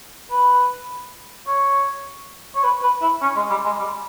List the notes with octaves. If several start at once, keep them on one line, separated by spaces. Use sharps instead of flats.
B4
C#5
C#5
B4
B4
E4
C#4
G#3
G3
G#3
G3